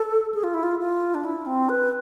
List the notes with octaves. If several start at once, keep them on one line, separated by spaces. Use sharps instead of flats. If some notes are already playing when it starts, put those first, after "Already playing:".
Already playing: A4
G#4
F4
E4
F4
F4
D4
E4
C4
B4